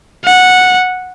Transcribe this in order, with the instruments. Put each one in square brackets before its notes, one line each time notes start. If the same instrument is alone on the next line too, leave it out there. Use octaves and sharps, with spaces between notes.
[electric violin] F#5